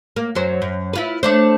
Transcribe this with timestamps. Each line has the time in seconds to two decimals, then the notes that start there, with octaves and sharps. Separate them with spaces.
0.16 A#3
0.35 F#2 F#3 C5
0.62 F#2
0.93 E4 F4 B4
1.23 A3 D4 C5